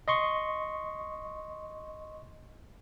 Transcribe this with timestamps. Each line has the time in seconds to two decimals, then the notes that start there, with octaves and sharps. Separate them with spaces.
0.08 D#5 C6 C#6